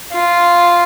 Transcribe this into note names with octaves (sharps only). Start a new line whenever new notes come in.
F4